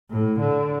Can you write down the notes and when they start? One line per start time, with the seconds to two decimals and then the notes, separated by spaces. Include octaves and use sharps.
0.10 A2
0.40 D3